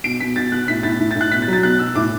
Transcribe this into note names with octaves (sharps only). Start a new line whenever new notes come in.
B2 D7
B2 B6
B2 A6
B2 F#6
A2 B6
A2 A6
A2
A2 A6
F#6
B2 B6
A6
F#3
A6
B2 F#6
B2 E6
A2 D6